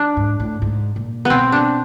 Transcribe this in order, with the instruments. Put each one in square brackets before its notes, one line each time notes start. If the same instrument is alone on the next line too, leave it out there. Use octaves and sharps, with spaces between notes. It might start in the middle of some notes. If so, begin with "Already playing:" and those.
Already playing: [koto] D4
[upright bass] G#2
A2
G#2
A#2
[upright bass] B2 [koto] B3 C4
[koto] D4